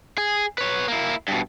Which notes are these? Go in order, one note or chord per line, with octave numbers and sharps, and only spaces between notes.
G#4
B4 C#5
A#3 E4
G2 B2